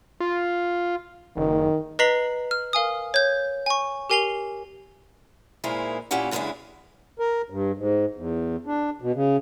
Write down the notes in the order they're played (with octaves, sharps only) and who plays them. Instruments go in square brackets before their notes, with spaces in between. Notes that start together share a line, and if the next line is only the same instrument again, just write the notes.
[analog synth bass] F4
[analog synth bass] F#1 [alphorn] D#3
[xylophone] B4 D#5 A#5 B6 C7 F#7
F6
A#4 F5 G#5 D#6
C#5 G6
G#5 C#6
G4 A#4 G#5 C7 F7 G7
[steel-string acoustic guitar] A#2 G#3 D#4 E4 A#4 C5
A#2 C#4 E4 G4 F#5
F#2 C#3 E3 G#3 D4 E4
[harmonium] A#4
G2
G#2
E2
D4
B2
C#3